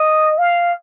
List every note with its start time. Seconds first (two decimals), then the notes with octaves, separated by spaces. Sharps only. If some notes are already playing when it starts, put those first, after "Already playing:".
Already playing: D#5
0.38 F5